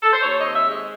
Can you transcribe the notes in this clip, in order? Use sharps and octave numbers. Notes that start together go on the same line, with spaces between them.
A4
C5
D#2 C#5
D#5
C4
E5
G#3 D#5